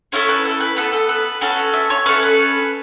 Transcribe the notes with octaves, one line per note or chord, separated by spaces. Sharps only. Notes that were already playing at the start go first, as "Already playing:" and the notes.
C#4 E4 A4 C#5
B4
A4
B4
B3 A4 B4
A4
B4
C#4 F#4 A4 B4
E5
C#5
C#4 A4 B4
B4